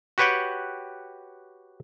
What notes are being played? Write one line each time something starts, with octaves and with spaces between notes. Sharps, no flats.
F#4 G4 B4 C#5 F#5 G5